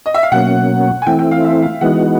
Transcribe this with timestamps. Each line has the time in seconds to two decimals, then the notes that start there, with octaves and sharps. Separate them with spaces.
0.06 D#5
0.14 E5
0.23 F5
0.32 B2 F#3 A#3 C#4 F#5
1.02 G#5
1.06 E3 A3 C4 E4 G5
1.19 G5
1.31 F5
1.44 E5
1.62 F5
1.81 E3 G#3 B3 D#4 F#4 F#5